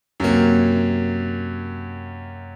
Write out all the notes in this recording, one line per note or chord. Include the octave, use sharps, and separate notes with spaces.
F#2 C3 F#3 A#3